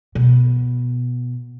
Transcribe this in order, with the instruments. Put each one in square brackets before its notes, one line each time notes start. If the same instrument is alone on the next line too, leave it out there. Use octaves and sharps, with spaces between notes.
[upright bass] B2